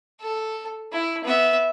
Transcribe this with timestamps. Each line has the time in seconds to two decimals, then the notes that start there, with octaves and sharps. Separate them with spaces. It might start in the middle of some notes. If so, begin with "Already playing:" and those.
0.21 A4
0.92 E4
1.24 B3 E5